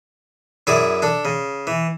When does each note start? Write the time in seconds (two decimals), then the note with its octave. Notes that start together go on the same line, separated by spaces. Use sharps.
0.67 F#2 E4 G#4 D5 D6
1.02 D4 A4
1.25 C#3
1.67 E3